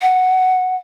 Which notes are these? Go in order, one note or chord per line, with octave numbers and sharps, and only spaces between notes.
F#5